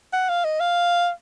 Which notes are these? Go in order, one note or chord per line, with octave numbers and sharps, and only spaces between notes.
F#5
F5
D#5
F5